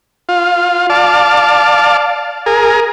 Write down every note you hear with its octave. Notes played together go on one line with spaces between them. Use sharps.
F4
D5 F5 A5
G#4 A#4